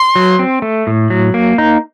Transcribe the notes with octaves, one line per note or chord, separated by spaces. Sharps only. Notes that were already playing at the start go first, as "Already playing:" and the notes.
Already playing: C6
F#3
C4
A3
A2
F#3
A#3
D#4